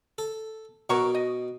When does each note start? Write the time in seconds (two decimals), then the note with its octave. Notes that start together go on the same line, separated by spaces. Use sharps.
0.18 A4
0.90 B2 F#3 A#4 C#6
1.15 D#5